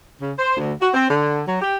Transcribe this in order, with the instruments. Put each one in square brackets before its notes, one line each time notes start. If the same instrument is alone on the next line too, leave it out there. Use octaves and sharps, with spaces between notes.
[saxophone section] C#3
C5
D2
F#4
C4
D3
F#3
G4